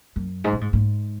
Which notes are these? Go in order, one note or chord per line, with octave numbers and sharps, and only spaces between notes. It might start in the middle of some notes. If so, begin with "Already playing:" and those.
F#2
G#2
A#2
G#2
G#2